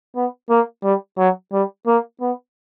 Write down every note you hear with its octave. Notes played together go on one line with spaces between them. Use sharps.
B3
A#3
G3
F#3
G3
A#3
B3